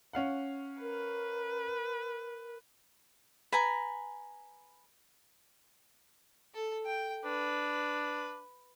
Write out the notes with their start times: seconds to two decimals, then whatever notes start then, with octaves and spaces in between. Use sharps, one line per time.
0.13 C#4 F5 F#5
0.81 A#4 B4
3.52 B4 G#5 A#5
6.55 A4
6.86 G5
7.25 D4 B4